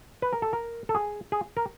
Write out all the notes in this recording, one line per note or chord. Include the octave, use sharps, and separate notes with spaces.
B4
A#4
A4
A#4
A4
G#4
G#4
A#4